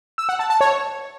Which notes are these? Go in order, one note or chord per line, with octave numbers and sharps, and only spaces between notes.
E6
F#5
A5
A5
C#5